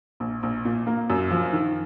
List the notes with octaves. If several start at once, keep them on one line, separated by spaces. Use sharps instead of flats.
A#1
A#1
A#2
A#3
F#2
F3
D#3